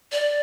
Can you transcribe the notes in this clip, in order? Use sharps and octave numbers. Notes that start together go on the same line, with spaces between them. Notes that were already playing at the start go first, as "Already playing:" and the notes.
D5